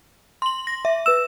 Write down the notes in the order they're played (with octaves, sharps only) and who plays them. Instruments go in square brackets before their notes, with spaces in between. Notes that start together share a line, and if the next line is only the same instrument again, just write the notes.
[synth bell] C6 F#7
A#6
E5
[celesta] B4 E6 [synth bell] E7